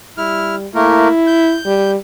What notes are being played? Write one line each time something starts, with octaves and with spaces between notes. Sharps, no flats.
G3 E4 F6
A3 A#3 E4 A#4
G6
G3